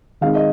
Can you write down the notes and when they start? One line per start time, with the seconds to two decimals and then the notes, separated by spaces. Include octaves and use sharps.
0.21 D#3 G#3 C4 D#4 F5
0.35 D#5